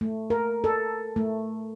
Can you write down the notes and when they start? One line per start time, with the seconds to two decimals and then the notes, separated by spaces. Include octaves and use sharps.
0.01 A3
0.30 A#4
0.64 A4
1.16 A3